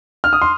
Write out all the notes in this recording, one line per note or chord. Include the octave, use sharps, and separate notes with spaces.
F6
D#6
C6